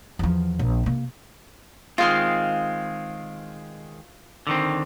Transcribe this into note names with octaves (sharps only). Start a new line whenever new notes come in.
E2 F3
A#1
C3 A#3
D#3 G#3 C4 F4 F5 C6
D3 D#3 C4